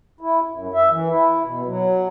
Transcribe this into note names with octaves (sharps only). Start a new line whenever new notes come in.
E4
F#2
E5
E3
E4
B2
F#3